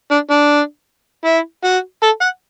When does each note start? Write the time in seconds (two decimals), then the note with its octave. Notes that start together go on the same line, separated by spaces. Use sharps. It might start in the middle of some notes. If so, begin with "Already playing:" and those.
0.11 D4
0.30 D4
1.25 E4
1.64 F#4
2.03 A4
2.21 F#5